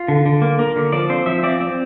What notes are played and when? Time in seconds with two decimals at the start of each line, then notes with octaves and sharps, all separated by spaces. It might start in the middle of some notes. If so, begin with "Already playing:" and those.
Already playing: F4
0.08 D3
0.26 D3
0.42 A#3
0.59 A#3
0.76 D3
0.92 F3 D5
1.09 C4 C5
1.26 F3 E5
1.43 C4 D5
1.61 C4